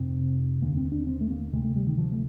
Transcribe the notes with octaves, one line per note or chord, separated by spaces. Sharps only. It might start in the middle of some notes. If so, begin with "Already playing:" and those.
Already playing: F2 C3 C4
D#2 D3 A#3
C4
D4
C4
A3
A#3
D2 C3 A3
A3
G3
D#3
F3
A3